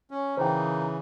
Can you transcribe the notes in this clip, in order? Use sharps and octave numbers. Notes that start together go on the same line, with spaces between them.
C#4
C#3 E3 A#3 D#4 C5 G5